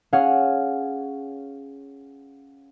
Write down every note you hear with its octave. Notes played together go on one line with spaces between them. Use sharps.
C#4 G#4 F5 F#5